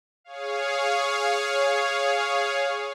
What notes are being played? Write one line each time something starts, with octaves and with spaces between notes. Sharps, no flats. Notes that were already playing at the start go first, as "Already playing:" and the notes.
G#4 C#5 F5